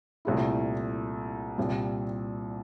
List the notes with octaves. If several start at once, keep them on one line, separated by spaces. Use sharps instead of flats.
C2 A#2 A3 E4
C2 A#2 G3